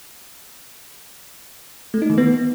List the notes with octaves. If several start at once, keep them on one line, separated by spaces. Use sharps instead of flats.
A3
D#4
D#3
B3